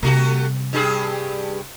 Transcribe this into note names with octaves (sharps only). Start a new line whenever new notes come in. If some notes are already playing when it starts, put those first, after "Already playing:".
C3 G3 A3 F#4 G4
G2 G4 G#4